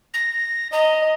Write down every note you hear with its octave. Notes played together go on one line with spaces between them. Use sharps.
A#6
D#5 A#5